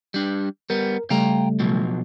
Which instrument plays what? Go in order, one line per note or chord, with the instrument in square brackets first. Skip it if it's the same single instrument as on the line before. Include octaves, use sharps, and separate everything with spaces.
[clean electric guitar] G3 D4
[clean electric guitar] G3 B3 [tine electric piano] A#4
[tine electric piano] C#3 G3 A3 [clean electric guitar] F5 G5 A#5
[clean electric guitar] B2 F3 F#3